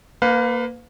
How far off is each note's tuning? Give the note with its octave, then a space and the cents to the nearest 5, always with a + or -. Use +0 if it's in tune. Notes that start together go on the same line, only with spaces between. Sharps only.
A#3 +0 B4 +30 F5 +30